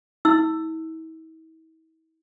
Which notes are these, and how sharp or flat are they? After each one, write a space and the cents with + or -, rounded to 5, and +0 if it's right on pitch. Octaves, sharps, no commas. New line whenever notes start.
E4 -45 E6 +10